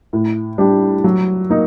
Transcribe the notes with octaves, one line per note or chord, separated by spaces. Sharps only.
A2
G3 D4 G4
F#3
A#3 D#4